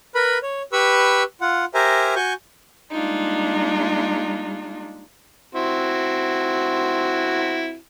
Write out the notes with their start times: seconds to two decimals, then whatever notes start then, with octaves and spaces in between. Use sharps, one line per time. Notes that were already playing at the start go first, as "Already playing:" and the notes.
0.15 A#4 B4 B5
0.43 C#5
0.72 G4 B4 B5 C#6 E6
1.41 F4 F#5
1.74 G4 A#4 C5 E5 G#5 A#5
2.16 F#4 G#5 C#6 G6
2.91 G3 G#3 A#3 D4 D#4 F4
5.55 C4 E4 F#4